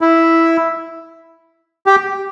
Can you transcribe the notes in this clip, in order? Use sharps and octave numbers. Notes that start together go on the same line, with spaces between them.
E4
G4